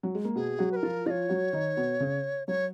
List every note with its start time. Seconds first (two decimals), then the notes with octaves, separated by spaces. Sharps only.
0.03 F#3
0.15 G#3
0.25 A#3
0.35 B2 B3 G#4
0.59 F#3 F#4
0.72 B4
0.76 A#4
0.83 F3 F4
1.06 F3 F4 C#5 D#5
1.29 F#3 F#4
1.53 D#3 D#4
1.77 B2 B3
2.00 C#3 C#4
2.47 F#3 F#4 C#5